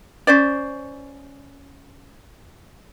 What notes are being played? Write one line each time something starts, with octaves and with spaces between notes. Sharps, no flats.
C#4 C5 D5